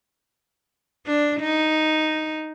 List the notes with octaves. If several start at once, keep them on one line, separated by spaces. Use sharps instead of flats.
D4
D#4